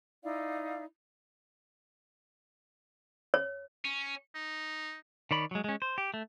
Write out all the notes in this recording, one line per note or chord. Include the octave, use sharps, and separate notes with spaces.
D#4 E4 D5 F5
C#5
C#4
D#4
D#3 C#5 D5 B5
F#3 G#3
G#3 C#4
C5
G4
A3